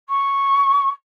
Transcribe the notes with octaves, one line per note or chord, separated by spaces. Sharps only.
C#6